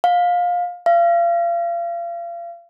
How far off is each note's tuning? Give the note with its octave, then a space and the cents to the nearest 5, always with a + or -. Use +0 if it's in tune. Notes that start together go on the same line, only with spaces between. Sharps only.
F5 +20
F5 -35